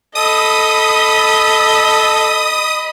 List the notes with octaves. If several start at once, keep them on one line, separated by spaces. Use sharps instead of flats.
A4 D#5 B5 D#6